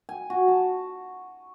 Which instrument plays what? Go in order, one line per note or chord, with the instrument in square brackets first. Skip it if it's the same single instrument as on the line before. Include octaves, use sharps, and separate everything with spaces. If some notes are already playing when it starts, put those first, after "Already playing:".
[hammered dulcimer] G#5
F#4
A5